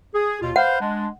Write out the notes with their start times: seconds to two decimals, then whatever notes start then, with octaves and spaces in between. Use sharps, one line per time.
0.14 G#4
0.41 D#2 B2 F4
0.56 B4 C5 F5 F#5
0.81 G#3 D4